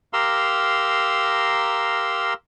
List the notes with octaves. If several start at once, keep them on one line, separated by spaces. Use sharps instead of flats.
G4 A#4 F5 A#5 C6 E6